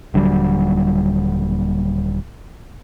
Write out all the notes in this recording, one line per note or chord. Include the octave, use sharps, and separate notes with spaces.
D#1 D3 F#3 G3